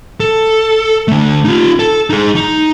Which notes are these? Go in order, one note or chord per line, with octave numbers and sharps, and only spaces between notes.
A4
D3 A3
D#4 F4
A4
D#4 G#4
D#4